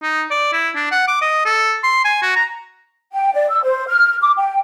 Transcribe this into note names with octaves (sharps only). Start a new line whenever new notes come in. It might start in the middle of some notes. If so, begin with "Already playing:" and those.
D#4
D5
E4
D4
F#5
D6
D#5
A4
C6
G#5
F#4
A#5
G5
D5
E6
C5
F6
D6
G5